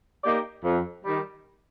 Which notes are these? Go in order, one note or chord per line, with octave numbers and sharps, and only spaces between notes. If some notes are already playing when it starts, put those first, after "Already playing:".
A#3 D#4 G4 D5
F2
D#3 G3